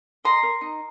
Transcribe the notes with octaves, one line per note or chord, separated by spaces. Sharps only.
D#5 A#5 C6
A#4
D#4